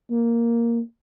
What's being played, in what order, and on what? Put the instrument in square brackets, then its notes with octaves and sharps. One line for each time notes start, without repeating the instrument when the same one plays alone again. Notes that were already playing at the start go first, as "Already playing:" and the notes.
[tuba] A#3